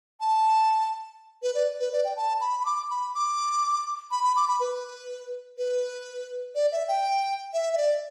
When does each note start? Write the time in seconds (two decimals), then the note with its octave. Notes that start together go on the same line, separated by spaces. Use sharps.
0.20 A5
1.43 B4
1.55 D5
1.80 B4
1.92 D5
2.05 G5
2.16 A5
2.41 B5
2.60 B5
2.65 D6
2.90 B5
3.15 D6
4.11 B5
4.24 B5
4.36 D6
4.48 B5
4.60 B4
5.58 B4
6.55 D5
6.72 E5
6.88 G5
7.54 E5
7.73 E5
7.77 D5